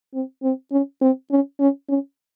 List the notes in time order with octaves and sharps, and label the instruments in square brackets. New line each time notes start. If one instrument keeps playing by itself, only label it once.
[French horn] C4
C4
C#4
C4
C#4
C#4
C#4